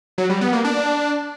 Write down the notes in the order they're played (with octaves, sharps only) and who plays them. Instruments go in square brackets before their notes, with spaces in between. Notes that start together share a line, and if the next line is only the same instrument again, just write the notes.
[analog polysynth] F#3
G3
B3
A#3
D4